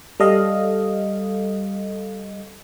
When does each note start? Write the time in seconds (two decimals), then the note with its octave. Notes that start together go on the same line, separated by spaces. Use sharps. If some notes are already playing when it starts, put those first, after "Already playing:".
0.20 G3 A4 D#5 F5